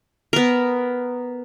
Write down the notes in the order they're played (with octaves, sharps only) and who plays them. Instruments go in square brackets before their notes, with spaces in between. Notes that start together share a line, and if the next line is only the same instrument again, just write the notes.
[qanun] B3 A#4